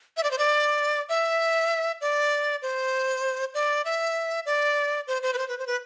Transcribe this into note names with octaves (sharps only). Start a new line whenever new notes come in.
E5
D5
C5
D5
E5
D5
C5
D5
E5
D5
C5
C5
B4
C5
B4
C5
B4